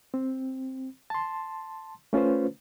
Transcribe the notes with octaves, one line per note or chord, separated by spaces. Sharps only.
C4
A5 C6
A3 C#4 F4 B4 C5